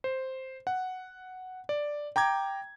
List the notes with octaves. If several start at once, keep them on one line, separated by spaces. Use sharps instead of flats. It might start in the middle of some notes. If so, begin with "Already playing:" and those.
C5
F#5
D5
G5 A#5 D6 G#6